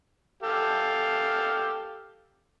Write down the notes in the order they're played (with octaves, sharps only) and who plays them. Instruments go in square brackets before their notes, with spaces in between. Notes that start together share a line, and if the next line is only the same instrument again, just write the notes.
[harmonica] G4 A4 F5